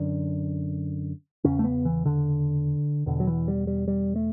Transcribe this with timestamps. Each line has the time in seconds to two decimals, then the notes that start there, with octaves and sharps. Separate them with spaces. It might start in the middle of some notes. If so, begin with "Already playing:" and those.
Already playing: F#2 D3
1.44 E2 C#3 C#4
1.59 A3
1.64 B3
1.85 E3
2.06 D3
3.06 E2 B2 D3
3.20 F#3
3.27 E3
3.48 G3
3.67 G3
3.88 G3
4.16 A3